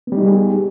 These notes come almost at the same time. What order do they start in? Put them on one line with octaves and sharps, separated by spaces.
B3 G3 D#4 G4 G#4